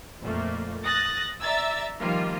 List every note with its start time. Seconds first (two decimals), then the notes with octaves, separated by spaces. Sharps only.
0.22 F2 A#2 A3 A#3
0.85 D#6 F#6 A6 A#6
1.42 D5 E5 A#5 E6 A6
2.00 D#3 F3 G3 A#3 F4